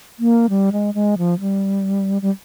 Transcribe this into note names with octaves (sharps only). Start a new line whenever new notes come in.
A#3
G3
G#3
G#3
F3
G3
G3